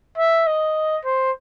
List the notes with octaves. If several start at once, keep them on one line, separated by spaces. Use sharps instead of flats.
E5
D#5
C5